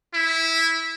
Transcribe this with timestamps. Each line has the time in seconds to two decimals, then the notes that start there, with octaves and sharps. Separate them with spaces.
0.14 E4